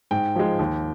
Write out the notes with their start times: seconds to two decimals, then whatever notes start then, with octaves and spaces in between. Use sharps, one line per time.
0.11 G#2 G5
0.35 F3 G#3
0.59 D#2